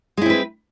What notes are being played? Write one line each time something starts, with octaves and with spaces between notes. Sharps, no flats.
G#3 C4 E4 B4